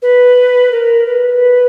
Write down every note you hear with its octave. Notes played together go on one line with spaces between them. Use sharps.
B4
A#4
B4